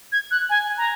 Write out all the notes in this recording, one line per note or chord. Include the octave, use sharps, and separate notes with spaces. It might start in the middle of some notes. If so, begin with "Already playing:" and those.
G#6
F#6
G#5
A#5